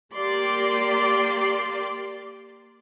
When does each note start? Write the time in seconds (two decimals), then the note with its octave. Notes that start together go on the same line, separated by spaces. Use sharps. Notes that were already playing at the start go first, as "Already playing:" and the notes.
0.14 A#3 G4 D5 C6